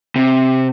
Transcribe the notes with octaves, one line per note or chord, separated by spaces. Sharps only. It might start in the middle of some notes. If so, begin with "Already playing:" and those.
C3